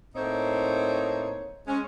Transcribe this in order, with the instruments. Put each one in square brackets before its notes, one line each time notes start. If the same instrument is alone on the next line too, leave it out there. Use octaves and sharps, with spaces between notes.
[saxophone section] A2 A#3 C4 D#4 C5 C#5
G#3 C#4